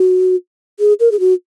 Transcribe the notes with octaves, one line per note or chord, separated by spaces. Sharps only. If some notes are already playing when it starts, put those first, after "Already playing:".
Already playing: F#4
G#4
A#4
G#4
F#4